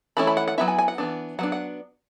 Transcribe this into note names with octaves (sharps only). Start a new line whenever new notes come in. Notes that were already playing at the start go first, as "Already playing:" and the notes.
E3 A3 C#4 E4 B5
B5
F#5
F#5
F#3 B3 E4 E5
G#5
G#5
F#5
E3 B3 D4
F#3 B3 D4 F#5
F#5